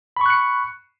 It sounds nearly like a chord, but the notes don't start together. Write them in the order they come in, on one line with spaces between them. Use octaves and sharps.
B5 C#6 F#6 C#7